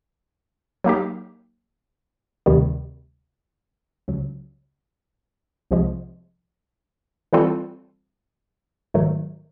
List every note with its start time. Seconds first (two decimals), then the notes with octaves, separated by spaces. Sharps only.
0.84 F#3 A#3 D#4 G4
2.46 D2 C3 D#3 G3
4.08 C#2 C#3 F#3
5.71 C2 C3 F3 G#3
7.33 E3 G3 C4 F4 A4
8.94 G#2 D#3 F#3 A3